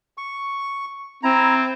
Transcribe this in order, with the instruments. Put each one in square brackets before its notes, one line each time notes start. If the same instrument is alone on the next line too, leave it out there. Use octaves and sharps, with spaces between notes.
[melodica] C#6
[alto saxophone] C4 [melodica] E4 A#5